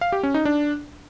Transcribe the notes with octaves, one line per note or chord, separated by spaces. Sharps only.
F5
G4
C#4
D#4
D4